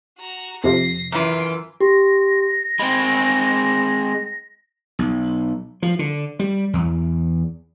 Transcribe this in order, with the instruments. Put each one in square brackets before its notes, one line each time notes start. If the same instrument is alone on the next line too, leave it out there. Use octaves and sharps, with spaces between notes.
[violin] F#4 A#5
[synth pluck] F2 C3 F3 [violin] A#6 C7
[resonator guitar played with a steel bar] F#2 E3 [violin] F4 D7
[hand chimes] G4 C6 [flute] A#6
[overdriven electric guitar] G#3 C4 [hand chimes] B5
[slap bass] B1
F3
D3
G3
E2